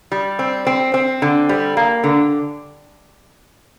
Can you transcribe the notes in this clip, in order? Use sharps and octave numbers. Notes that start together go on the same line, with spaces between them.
G3
C4
C4
C4
D3
G3
A#3
D3